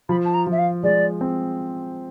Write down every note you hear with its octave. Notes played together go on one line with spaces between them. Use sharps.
F3 B5
A5
A#5
F3
E5
F5
G#3 D5
C4